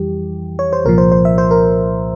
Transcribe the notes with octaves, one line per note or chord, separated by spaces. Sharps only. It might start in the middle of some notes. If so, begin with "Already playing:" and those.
Already playing: F2 E3 G3 G4
C#5
C5
C2 A#2 F3 A#4
C5
C5
E5
C5
A#4